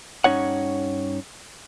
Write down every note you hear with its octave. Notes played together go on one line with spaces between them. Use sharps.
G2 C#4 D#4 C#5 F#5